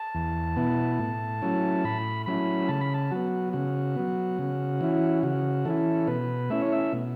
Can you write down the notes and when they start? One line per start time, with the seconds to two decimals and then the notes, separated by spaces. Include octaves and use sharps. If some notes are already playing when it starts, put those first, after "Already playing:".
Already playing: A5
0.15 E2
0.57 B2 B3 E4
0.99 A2
1.42 F#3 A3 C#4 E4
1.84 A2 B5
2.26 F#3 A3 C#4 E4 B5
2.68 C#3 A5
2.81 B5
2.94 A5
3.11 F#3 B3 F#4
3.53 C#3 F#4
3.96 F#3 B3
4.39 C#3
4.81 E3 C#4 E4
5.23 C#3 F#4
5.65 E3 C#4 E4 A4
6.07 B2 B4
6.50 A3 C#4 E4 E5
6.62 C#5
6.72 E5
6.93 B2